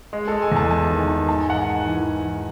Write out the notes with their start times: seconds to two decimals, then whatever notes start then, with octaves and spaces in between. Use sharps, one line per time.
0.13 G#3
0.28 A4
0.32 G#3
0.42 G#5
0.52 E2 A5
0.71 G#3 A5
0.90 D#3
1.09 D#3
1.28 G#2 A5
1.39 G#5
1.48 G#2 F#5
1.60 G#5
1.67 G#2
1.86 E3
2.06 E3
2.25 G#2